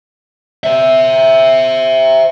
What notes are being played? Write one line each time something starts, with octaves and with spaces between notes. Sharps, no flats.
C5 E5